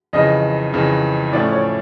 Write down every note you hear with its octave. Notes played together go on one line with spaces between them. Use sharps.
F2 C#3 E3 D#5
F2 C#3 E3
A2 F3 A3 C#4 D5
C#5